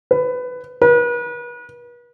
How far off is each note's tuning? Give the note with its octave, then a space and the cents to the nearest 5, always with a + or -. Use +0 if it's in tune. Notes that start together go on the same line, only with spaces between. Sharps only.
B4 +15
B4 -40